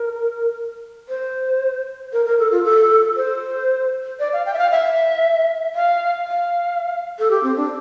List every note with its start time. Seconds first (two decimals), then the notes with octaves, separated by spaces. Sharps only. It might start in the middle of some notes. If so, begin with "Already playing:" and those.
Already playing: A#4
1.09 C5
2.13 A#4
2.25 A#4
2.39 A4
2.52 F4
2.64 A4
3.16 C5
4.20 D5
4.33 F5
4.46 G5
4.54 E5
4.58 F5
4.71 E5
5.75 F5
6.27 F5
7.19 A4
7.31 G4
7.43 C4
7.56 D4